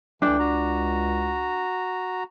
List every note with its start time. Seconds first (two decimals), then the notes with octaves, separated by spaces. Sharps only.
0.22 C#2 E3 A3 D4 G5
0.39 F#4 A#5